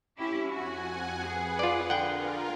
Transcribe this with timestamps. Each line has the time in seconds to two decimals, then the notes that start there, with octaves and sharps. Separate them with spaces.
0.18 C#4 E4 G4
0.47 F2 F#4 F#5 G#5
1.22 G#4 B4 F#5
1.59 F4 D5
1.90 D3 F4 A#4 F#5 G5